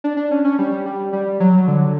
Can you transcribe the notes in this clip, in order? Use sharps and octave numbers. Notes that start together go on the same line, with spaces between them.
D4
D4
C#4
C#4
G3
G3
G3
F#3
D3